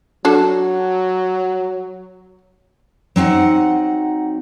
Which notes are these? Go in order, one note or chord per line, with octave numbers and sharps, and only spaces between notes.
F#3 D4 F#4 A4
F#3 C4 D#4 F#5